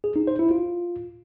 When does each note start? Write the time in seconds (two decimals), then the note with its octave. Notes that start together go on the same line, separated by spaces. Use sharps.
0.04 G#4
0.16 D#4
0.27 C5
0.39 E4
0.51 F4